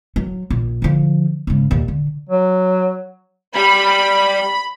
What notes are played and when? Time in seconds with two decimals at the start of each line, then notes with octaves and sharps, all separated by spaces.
0.16 F#3
0.50 A#1
0.82 D3 F3
1.47 G#2 C#3
1.71 D#2 A#2
1.88 D3
2.29 F#3
3.56 G3 B5